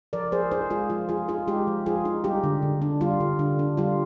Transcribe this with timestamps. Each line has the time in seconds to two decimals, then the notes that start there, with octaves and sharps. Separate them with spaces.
0.13 F3 A#4 D5
0.32 F3 G#4 C5
0.51 D#4 G#4 C5
0.70 G#3 F4 G#4
0.90 F3 F4
1.09 F3 F4 G#4
1.28 D#4 F4 G#4
1.47 G#3 D#4 G4
1.67 F3
1.86 F3 F4 G#4
2.05 D#4
2.24 G3 D#4 G4
2.44 D3
2.62 D3
2.82 D4
3.01 G3 F4
3.20 D3
3.39 D3
3.59 D4
3.77 G3 F4